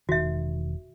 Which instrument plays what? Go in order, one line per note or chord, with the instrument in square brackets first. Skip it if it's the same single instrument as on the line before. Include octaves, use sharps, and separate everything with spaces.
[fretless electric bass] E1 D#3 [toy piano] F#4 E5